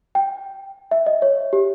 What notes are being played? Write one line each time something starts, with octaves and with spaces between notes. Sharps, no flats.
G5
E5
D#5
C#5
G4